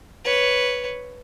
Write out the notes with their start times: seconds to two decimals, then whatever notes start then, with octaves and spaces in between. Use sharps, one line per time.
0.25 B4 C#5